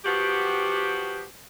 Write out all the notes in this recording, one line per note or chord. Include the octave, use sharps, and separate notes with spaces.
F3 B3 F#4 G4